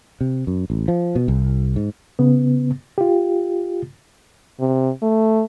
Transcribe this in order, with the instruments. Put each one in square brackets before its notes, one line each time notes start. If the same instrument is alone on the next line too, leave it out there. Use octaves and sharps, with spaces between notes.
[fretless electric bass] C3
F#2
A1
F3
B2
C2
G#2
[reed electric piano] C#3 B3
F4 G4
[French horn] C3
A3